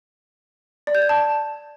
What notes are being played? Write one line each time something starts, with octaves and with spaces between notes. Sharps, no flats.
D5
G6
G#6
A5